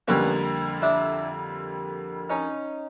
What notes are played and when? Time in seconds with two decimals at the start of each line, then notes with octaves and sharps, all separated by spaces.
0.08 F2 D3 G3 A#3 B3 C#4
0.82 D4 E4
2.30 C#4 D#4